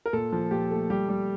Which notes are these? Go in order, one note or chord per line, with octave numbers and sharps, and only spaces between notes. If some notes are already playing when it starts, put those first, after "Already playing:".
A#4
A#2 A4
F3
A#2 G4
A3
G3 G4
G3